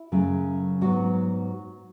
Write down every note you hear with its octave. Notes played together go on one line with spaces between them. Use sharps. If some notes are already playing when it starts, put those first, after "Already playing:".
Already playing: E4
F#2 C#3 F#3 A3
G#2 F#3 B3 F#4